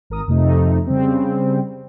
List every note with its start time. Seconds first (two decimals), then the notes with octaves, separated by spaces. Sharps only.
0.10 G#1 A#4 D#6
0.28 F2 C3 A3 D#4
0.87 C#3 G3 C4